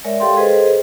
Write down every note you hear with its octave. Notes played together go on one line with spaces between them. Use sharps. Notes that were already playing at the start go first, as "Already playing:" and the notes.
G#3 A#4 C#5 D5 E5
G4 A4 F5 G5 C6
G#4 A4 B4 C5 D#5